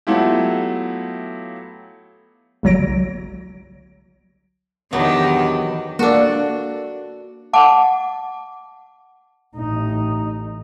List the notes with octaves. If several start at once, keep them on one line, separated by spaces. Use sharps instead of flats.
F#3 A3 B3 E4 F4 G4
G1 C2 F#3 C#5 A#6 D7
E2 D#3 F#3 B3 D4 G4
A#3 D4 F#4 A4
F#5 A5 D6
A1 D#4